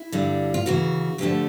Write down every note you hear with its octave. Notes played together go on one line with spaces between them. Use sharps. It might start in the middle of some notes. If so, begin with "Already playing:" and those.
Already playing: E4
G2 D3 G3
F4
D#2 C#3 E3 F#4
D2 D3 F3 A3 G4